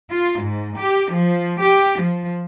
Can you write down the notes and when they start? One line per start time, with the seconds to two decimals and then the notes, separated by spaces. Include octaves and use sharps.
0.10 F4
0.41 G#2
0.78 G4
1.11 F3
1.62 G4
2.01 F3